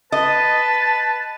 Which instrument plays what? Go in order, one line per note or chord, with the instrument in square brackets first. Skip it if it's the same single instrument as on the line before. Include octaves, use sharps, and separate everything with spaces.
[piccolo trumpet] B4 [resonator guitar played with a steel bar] D#5 [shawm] A5